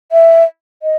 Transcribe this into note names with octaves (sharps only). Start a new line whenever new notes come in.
E5
D#5